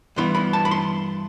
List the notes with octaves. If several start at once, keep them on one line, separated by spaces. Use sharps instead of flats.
G2 E3 B3 E4 C6
B5
A5
B5
C6